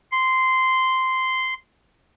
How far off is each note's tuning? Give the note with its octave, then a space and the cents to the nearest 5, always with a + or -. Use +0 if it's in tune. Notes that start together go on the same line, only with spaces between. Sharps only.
C6 -10